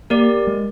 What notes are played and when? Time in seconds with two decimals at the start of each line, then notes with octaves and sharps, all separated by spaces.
0.10 A#3 G4 A#4 D5
0.47 G#3